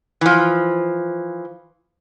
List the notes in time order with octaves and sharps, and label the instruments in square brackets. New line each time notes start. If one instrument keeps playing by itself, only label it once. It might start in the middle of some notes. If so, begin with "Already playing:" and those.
[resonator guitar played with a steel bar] E3 F3